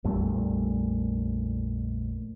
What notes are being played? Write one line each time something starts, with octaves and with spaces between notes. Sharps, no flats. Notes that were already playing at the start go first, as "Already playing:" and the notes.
A#1 F2 G3 A3